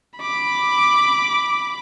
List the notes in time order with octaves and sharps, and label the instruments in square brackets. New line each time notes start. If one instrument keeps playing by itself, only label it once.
[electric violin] B5 D6